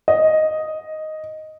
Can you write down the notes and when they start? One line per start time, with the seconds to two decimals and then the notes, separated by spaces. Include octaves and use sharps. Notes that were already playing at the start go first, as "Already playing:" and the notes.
0.08 D#5